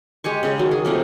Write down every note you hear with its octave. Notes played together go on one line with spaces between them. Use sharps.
G#3 G4 G#5 C#6
C#3 G#3 C#4
D#3 F#3
G#4
C3 F3 A3 A#3